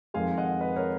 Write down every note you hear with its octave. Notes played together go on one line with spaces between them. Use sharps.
F2 D#3 G#3 F5 G#5
D#5 F#5
B4 D#5
A#4 C#5